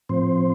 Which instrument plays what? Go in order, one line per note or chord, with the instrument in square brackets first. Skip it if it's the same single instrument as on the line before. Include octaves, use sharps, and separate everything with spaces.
[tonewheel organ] A2 F3 C4 C5